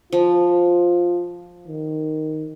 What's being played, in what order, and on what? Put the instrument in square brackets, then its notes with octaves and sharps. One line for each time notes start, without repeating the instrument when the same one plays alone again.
[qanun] F3 [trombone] F4
[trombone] D#3